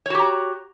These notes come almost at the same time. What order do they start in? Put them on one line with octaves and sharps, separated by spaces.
C#5 F#4 G4 A#5